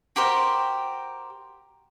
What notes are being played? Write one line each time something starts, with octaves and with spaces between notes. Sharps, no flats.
F#4 G4 A#4 C5